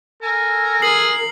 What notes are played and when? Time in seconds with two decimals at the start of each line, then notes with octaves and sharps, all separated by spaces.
0.22 A4 A#4 G#5
0.82 G#4 A#4 C7 F#7